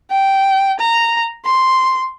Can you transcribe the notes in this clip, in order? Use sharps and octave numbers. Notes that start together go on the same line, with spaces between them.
G5
A#5
C6